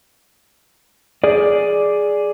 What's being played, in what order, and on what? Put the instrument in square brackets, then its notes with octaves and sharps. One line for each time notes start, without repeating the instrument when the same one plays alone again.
[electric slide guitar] G#4 D5